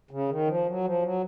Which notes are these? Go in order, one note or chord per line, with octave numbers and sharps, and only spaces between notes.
C#3
D#3
F3
F#3
F3
F#3